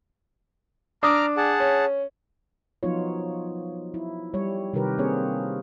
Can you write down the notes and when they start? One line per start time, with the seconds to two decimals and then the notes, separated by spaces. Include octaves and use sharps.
1.03 D4 A#5 D6 D#6 F6
1.37 G#4 F#5 A5
1.60 C#4
2.83 F3 F#3 B3 D#4 F4 C#5
3.94 E4
4.34 G3 C#5
4.73 C3 D#3 G3 G4 A#4 B4
4.98 A#3 C4 D4 G#4 C#5